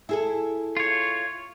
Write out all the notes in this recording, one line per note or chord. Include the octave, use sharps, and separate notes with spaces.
E4 G#4 A4
F4 C#5